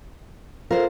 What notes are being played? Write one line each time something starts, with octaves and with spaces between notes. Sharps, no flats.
F4 A#4 C5